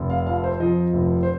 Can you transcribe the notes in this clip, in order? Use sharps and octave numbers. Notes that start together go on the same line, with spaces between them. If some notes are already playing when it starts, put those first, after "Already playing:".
Already playing: F1
F5
F2 F5
C5
F3 D#5
F1
C5